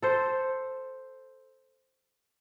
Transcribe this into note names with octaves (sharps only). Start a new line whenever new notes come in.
A4 C5